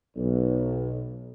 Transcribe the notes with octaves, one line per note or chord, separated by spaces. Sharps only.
B1